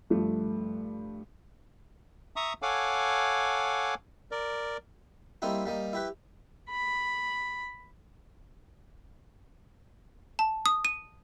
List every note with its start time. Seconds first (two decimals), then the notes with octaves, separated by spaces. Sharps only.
0.10 G2 F3 A3
2.36 E5 A#5 C#6 D#6
2.62 A4 C#5 F5 F#5 G#5 D6
4.31 A#4 D5
5.42 G3 A#3 C4 D#4 E4 G4
5.66 G3 A#3 D#4
5.93 E4 G4 B4
6.70 B5
10.39 A5
10.66 D#6
10.85 D#7